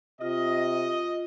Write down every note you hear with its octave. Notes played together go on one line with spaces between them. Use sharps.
C3 F4 D#5